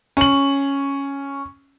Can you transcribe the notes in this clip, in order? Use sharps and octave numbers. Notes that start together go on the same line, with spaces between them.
C#4 F#7